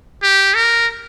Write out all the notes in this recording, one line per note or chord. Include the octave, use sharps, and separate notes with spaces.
G4
A#4